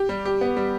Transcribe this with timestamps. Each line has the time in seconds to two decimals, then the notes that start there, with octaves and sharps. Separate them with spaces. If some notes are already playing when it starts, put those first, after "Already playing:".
Already playing: G4
0.09 G3
0.25 G4
0.41 B3
0.57 G3